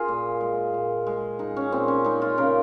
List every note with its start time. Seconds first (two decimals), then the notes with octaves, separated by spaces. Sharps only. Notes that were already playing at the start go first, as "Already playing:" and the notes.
Already playing: F4 G#4 A#4
0.08 A#2
0.41 G#3
0.74 A#2
1.07 G#3
1.39 G#3 D#4
1.57 C#4
1.72 A#2 C4
1.88 C#4
2.05 G#3 D#4
2.22 F4
2.38 C#3 A#4